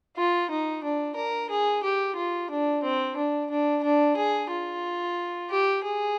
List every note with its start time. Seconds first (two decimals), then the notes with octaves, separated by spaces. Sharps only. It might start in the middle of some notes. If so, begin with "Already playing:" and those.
0.17 F4
0.51 D#4
0.84 D4
1.16 A#4
1.50 G#4
1.83 G4
2.16 F4
2.50 D4
2.83 C4
3.16 D4
3.51 D4
3.83 D4
4.17 G#4
4.51 F4
5.50 G4
5.84 G#4